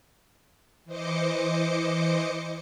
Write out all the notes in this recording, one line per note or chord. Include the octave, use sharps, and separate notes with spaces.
E3 C5 D#5 D6 C#7